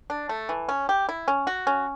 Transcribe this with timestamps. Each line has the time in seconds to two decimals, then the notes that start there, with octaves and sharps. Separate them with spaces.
0.10 D4
0.29 A3
0.49 E3
0.69 C#4
0.89 G4
1.09 E4
1.28 C#4
1.47 F#4
1.67 C#4